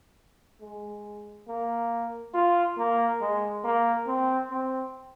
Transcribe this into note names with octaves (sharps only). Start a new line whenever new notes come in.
G#3
A#3
F4
A#3
G#3
A#3
C4
C4